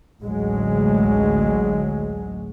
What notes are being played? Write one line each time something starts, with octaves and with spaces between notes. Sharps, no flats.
A1 D2 F#3 G#3